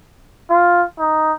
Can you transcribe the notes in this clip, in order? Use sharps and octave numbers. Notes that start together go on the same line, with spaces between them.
F4
D#4